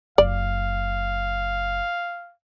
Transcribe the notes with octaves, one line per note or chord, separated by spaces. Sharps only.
F#1 D5 F5